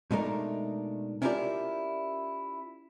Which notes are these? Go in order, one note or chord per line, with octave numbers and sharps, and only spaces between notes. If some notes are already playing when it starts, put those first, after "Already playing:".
B2 G#3 A3 D4 D#4 A#4
C#4 E4 F4 G4 A#4 D5